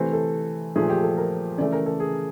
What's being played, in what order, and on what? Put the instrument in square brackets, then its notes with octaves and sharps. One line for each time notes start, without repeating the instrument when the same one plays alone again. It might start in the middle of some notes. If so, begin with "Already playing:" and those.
Already playing: [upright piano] C3 E3 A3 C5
A4
A#2 F3 A3 G#4
G4
A4
A#4
C#3 E3 A3 D5
A#4
A4
G#4